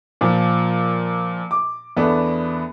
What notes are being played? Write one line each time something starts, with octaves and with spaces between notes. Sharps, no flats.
A#2 F3
D6
E2 A3 B3 D4